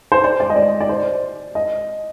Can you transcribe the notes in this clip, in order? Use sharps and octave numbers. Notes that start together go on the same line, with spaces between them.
C5
D5
D5
D#5
D5
D5
C5
D#5